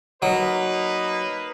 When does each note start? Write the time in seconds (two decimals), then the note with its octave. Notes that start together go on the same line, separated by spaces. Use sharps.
0.22 F#3 A#3 D#4 B4